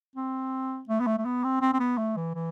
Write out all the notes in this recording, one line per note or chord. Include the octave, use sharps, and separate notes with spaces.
C4
A3
B3
A3
A3
B3
C4
C4
C4
B3
A3
E3
E3